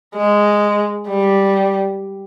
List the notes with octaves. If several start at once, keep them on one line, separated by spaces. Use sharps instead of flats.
G#3
G3